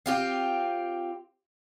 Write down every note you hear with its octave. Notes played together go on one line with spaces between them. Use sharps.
C4 F4 G4